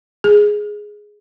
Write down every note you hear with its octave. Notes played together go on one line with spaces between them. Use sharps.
G#4